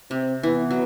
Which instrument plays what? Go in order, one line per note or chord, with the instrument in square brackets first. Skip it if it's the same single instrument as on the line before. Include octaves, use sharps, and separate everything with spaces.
[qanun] C3 [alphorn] C4
[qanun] E3 [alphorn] B3
[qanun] F#3